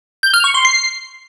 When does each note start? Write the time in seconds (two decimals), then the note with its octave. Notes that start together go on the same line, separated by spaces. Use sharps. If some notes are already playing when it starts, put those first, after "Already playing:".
0.23 G6
0.34 F6
0.44 C#6
0.54 C6
0.65 C7